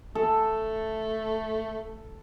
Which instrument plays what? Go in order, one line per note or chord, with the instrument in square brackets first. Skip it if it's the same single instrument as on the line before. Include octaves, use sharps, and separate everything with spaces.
[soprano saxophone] A3 [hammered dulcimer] A4